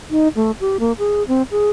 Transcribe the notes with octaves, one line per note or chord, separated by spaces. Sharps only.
D#4
A3
G4
A#3
G#4
C4
G#4